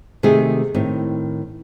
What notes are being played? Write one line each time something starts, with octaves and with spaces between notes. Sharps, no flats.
C3 D#3 A3 G4 G#4
A2 D#3 C4